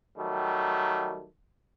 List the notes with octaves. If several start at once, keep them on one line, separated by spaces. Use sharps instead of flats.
D#3 F#3 G3 A3